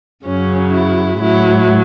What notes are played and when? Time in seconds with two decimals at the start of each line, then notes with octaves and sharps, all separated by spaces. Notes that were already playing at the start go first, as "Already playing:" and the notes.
0.25 F#2 C#3 F#3 C#4
0.72 E4
1.20 A2 F#3 E4